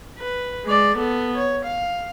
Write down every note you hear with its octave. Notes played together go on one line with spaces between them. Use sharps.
B4
G#3 D5
B3 A4
C#5
F5